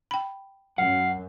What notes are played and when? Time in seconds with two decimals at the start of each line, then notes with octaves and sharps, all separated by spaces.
0.11 G5 B5
0.78 F#2 F5 F#5